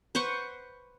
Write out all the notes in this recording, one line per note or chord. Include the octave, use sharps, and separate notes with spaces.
B4 C5 F#5 C#6